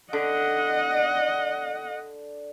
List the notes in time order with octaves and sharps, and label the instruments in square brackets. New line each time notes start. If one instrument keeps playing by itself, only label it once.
[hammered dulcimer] D3 [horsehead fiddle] D#5 F#5